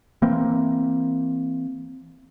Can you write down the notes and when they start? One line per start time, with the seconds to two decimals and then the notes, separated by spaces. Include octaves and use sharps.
0.22 E3 A#3 C4